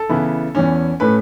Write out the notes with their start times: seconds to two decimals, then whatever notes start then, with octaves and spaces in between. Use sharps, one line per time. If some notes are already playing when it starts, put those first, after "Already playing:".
Already playing: A4
0.09 C#3 E3 B3 E4
0.55 E2 E3 C#4
1.00 A2 A3 C#4 B4